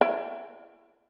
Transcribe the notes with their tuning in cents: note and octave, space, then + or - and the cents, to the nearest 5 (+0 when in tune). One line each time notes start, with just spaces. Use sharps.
E4 +35